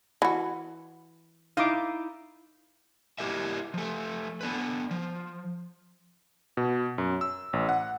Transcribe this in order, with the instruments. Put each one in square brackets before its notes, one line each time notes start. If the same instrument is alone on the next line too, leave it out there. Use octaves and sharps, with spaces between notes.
[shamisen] E3 F#4
[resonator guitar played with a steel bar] D#4 E4 [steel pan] F5 D6
[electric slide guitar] E4 G4 A#4 D#5 E5
F3 A3
B3 D4 B4
F3
[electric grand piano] B2
F#2
E6
A1
F#5